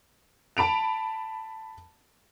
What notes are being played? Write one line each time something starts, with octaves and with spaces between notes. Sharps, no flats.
A5 B5 D7 F7